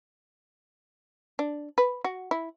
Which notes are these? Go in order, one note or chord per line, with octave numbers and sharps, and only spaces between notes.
D4
B4
F#4
E4